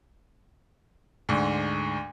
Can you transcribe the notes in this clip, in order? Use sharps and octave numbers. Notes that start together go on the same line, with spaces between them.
D2 G#2